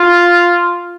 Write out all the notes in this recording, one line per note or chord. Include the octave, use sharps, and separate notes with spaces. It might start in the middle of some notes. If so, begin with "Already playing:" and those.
Already playing: F4